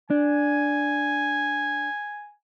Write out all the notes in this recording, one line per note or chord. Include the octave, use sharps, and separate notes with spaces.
D4 G#5